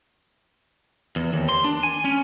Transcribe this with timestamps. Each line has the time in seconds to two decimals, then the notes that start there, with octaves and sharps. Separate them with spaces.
1.16 E2
1.33 D#2
1.49 C6
1.65 D4
1.83 G#5
2.05 C#4